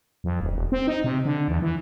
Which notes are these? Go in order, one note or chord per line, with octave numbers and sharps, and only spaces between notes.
F2
D1
E1
C4
D#4
C3
D3
E2
E3